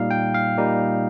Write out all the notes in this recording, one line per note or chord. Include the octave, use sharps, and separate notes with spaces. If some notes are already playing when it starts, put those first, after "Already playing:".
Already playing: A#2 G3 A#3 D#4 F5
G5
F5
A#2 G3 A#3 D#4